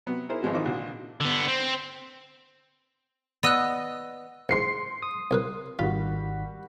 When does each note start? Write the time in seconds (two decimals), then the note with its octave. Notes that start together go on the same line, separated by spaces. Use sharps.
0.06 C3 F#3 B3
0.29 D#4 E4 G#4 A#4 C5
0.42 G#1 F3 G#3 B3 F#4
0.54 D#3 E3 D#4 F4 C5 D6
0.65 A#1 D3 F#4
1.21 D3 B3
1.48 C4
3.43 B3 D5 D#5 E6 F#6
4.49 A1 G#2 C6 C7 C#7
5.02 D#6
5.31 C2 A#4 B4
5.79 G#1 D#3 G3 F4 F#4 B6